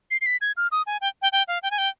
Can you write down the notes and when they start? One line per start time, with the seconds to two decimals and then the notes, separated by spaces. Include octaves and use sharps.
0.11 C7
0.21 C7
0.26 B6
0.41 G#6
0.57 F6
0.72 D#6
0.87 G#5
1.01 G5
1.22 G5
1.32 G5
1.48 F5
1.63 G5
1.71 G#5
1.78 G5